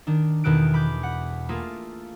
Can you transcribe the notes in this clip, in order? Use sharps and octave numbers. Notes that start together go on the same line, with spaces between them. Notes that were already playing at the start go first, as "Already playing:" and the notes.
D#3 D4
E2 B2 D#3 A4 F#6 D7
B5 D6 G6
F#5
A3 A#3 F4 G#4 A4